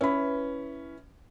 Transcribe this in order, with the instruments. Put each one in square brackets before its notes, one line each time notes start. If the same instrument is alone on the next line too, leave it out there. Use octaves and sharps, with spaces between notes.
[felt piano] C#4 B5 [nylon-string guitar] E4 B4 E5